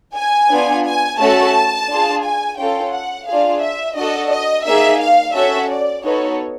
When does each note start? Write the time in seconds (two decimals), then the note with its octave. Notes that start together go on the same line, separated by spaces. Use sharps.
0.16 G#5
0.50 B3 D4 F4
0.85 G#5
1.20 A3 C#4 F#4 A4 A5
1.89 D4 F4 G#4
2.24 G#5
2.58 C#4 F4 A4 G5
2.93 F#5
3.27 D4 F4 G#4 F5
3.62 E5
3.97 D4 F#4 A4 D#5
4.31 D#5
4.66 A#3 D#4 G#4 E5
5.01 F5
5.35 C#4 F#4 A4 E5
5.70 D5
6.04 B3 D#4 F#4 A4 C#5